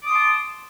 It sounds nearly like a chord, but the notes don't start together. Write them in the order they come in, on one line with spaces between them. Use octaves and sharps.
D6 D#6 C6 A5